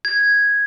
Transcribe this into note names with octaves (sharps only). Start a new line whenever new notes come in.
G#6